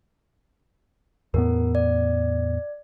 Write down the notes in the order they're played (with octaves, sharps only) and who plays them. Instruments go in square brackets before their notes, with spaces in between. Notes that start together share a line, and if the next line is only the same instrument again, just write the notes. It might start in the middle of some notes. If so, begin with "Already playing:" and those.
[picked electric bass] E2 A2 B3 [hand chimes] A#4
[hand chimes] D5